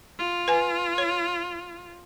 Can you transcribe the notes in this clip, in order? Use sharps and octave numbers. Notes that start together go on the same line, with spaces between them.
F4
B4 G#5
C#5